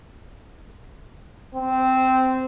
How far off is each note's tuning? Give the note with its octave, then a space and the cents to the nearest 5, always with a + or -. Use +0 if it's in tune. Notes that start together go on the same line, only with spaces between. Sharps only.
C4 -10